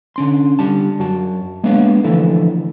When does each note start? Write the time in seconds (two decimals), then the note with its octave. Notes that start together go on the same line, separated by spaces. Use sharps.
0.16 D3 C#4 C6
0.59 D3 G3 A5
0.99 F#2 F#4 A5
1.63 G#3 A#3 B3 D4 C#5 F5
2.04 D3 E3 F3 A3 E4 A4